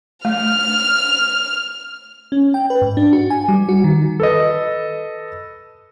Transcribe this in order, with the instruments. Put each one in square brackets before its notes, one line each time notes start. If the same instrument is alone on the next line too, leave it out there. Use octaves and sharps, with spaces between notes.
[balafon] A3 [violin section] F6
[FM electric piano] C#4
G5
B4
G#2
D4
F#4
G#5
G3
F#4
D#3
[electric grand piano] A4 B4 D#5